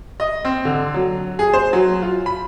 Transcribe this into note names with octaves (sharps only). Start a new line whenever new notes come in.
D#5
C4
D3
F#3
G#4
C5
F#3
F4
B5